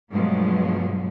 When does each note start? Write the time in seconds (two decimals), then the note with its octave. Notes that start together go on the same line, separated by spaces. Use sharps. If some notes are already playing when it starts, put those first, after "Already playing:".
0.11 G2 B2 F3 F#3 G#3 A3